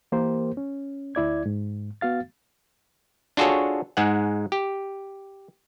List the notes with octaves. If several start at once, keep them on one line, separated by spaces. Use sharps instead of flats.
E3 A#3 G4 A#4 C5
C#4
D2 E4 D5 G#6
G#2
B3 F#4 F5 A6
D4 F4 F#4 G#4 A4 C#5
G#2 G#3 F#5
G4